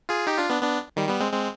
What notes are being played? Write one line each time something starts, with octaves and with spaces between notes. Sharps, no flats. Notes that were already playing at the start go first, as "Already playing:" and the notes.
F4 G#4
D#4 G4
D4 F4
B3 D4
B3 D4
D#3 G3
G3 B3
G#3 C4
G#3 C4